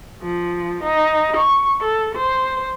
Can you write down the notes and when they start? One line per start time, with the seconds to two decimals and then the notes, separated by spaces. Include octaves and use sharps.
0.22 F3
0.84 D#4
1.37 C#6
1.83 A4
2.16 C5